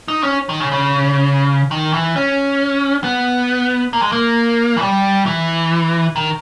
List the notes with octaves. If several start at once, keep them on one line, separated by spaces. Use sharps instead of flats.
D#4
C#4
D#3
C#3
C#3
D#3
E3
C#4
B3
A#3
G#3
A#3
E3
G3
E3
D#3